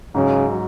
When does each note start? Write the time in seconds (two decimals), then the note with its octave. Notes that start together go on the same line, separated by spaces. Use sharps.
0.14 G#2 C#3 F#3 C#4
0.52 F#3